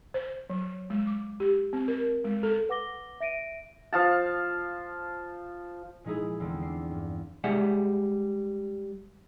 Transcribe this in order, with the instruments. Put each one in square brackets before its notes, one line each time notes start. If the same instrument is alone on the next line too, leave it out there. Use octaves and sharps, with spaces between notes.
[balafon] C5
F#3
G#3
D6
G4
C4
A#4
G#3
A4
[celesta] B4 F#5 D6 A#6 G7
E5 A#6 D7 D#7
[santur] F3 F5 A5
[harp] A#2 F3 G#3 D#4 E4 G#4
E2 D3 G#3 C4
D4 C7
G2
[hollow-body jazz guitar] G3 G#3 G#4 E5 F#5